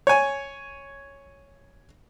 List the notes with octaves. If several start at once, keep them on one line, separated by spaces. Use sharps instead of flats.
C#5 G#5